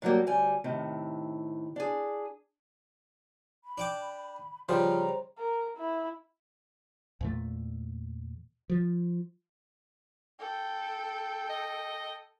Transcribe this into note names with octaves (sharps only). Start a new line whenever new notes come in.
A2 F#3 G3 A#3
D2 G3 G#5
A2 C3 D#3
D4 G#4
B5
D4 G5 D6
C#3 F3 G3 C5 A#5
A#4
E4
E2 A#2 A3
F3
A4 G5
D#5